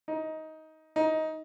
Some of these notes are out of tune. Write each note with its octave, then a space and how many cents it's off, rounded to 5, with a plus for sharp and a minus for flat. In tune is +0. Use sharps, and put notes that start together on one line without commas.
D#4 +15
D#4 +15